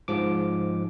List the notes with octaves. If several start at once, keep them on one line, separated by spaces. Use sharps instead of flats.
G#2 F3 D6